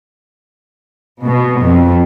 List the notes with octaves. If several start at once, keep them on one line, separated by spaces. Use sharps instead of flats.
B2
F2